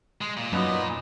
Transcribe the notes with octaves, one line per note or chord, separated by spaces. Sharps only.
G#3
A#2
F#2 B3 D#4